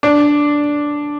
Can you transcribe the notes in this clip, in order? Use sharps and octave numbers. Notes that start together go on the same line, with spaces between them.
D4